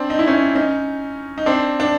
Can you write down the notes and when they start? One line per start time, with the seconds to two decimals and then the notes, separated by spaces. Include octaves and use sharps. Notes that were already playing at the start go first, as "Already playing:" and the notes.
Already playing: C4 D4
0.10 D#4
0.19 E4
0.27 C#4 D#4
0.55 C#4 D#4
1.38 D#4
1.46 C4 D4
1.80 D4